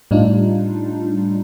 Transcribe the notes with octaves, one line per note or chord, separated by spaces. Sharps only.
A2 G3 D4 D#4 F4